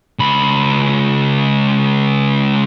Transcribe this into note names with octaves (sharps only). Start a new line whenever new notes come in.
C#2 B5